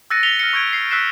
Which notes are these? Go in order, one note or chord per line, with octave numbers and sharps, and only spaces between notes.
E6 F#6 A6 A#6 C#7 D#7
B6 C#7 F7 G7
F6 A#6 C#7
C#6 G6 G#6 D7
C7
E6 F#6 B6 C7 E7